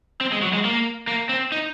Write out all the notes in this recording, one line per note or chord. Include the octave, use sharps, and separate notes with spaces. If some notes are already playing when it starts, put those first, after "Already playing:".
C4
G#3
F#3
G#3
A#3
A#3
C4
D#4